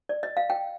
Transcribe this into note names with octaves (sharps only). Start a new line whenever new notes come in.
D5
D#5
F5
G5